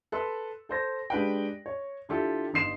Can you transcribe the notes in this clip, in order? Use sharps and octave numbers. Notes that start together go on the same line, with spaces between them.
A4 B4 C6 E6
A4 C5 A#6
G#3 D4 G4 B4 F5 G5
C#5
D3 E4 F4 G4 A4
G1 D#4 C6 C7 E7